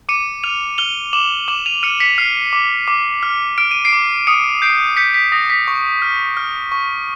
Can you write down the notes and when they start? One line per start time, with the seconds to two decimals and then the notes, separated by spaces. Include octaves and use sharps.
0.09 D6 C#7 D#7
0.44 F6 D#7 F7
0.78 F6 F7 G7
1.13 D6 E7 F#7
1.48 D6 E7 F#7
1.66 D#7 F7
1.83 F6 C#7 D#7
2.00 B6 C#7
2.18 F6 C7
2.53 D6
2.88 D6
3.23 F6
3.58 F6 D7
3.71 D#7
3.85 C7 D7
3.93 D6
4.27 D#6 C#7 D#7
4.62 G6 C7 D7
4.97 G6 B6 C#7
5.14 B6
5.32 D#6 A#6
5.50 B6
5.68 C#6
6.02 F6
6.37 F6
6.72 C#6